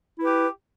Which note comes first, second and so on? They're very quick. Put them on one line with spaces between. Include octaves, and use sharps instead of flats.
E4 B4 G4